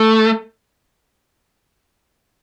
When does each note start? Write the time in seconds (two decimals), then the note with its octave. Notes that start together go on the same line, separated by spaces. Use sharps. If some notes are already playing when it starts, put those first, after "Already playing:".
Already playing: A3